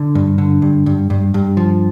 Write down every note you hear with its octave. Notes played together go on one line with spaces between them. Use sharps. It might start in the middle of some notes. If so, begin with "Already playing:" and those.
Already playing: D3
G2
D3
G2
G2
G2
G2
F3